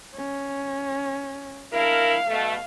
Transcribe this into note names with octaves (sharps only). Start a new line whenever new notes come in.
C#4
D4 E4 A#4 F5
B2 A3